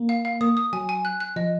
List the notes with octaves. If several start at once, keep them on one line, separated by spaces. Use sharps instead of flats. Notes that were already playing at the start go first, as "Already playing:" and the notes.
Already playing: A#3
F5
F5
A#3 D#6
D#6
F#3 G#5
G#5
F#6
F#6
F3 D#5